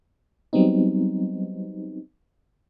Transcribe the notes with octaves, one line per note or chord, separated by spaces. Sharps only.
F#3 G3 B3 C4 D#4